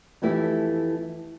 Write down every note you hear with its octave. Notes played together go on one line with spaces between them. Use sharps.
F2 E3 A3 E4 G4 E5